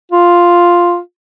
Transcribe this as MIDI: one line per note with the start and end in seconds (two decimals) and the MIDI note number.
0.12 0.99 65